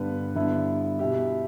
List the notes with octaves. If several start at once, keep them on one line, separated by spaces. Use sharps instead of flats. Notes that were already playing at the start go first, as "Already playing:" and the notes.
Already playing: G2 D3 B3 G4 B4
G2 D3 B3 E4
B2 B3 E4 G4